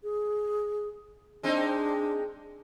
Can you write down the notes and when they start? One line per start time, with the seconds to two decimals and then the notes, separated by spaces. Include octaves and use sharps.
0.03 G#4
1.43 G#3 C4 D4 D#4